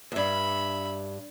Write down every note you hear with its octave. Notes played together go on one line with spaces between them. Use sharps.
E2 G2 E5 B5